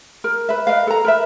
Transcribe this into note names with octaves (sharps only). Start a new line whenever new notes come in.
A#4
B4 E5
A#4 B4 D#5 F5
A4 A#5
A#4 B4 E5